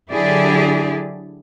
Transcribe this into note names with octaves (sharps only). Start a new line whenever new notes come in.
D3 F#3 E4 G4 G#4 D5